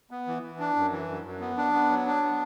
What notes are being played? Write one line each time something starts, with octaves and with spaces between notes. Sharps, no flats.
B3
E3
E3
D4
F#2
E3
F#2
F#2
B3
D4
B3
F#3
D4
B3